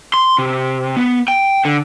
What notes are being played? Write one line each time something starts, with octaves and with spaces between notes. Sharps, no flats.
C6
C3
B3
G5
D3